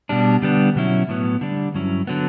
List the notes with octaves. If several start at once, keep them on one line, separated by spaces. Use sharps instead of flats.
B2 G3 D4
D3 G3 B3 D4
B2 F#3 C#4 E4
A2 F#3 B3
D3 G3 D4
G2 F#3 C#4 E4
D3 F#3 B3